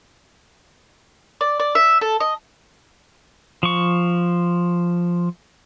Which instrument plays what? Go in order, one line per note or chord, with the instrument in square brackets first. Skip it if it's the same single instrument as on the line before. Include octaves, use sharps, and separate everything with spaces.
[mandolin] D5
D5
E5
A4
D#5
[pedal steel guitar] F3 C#6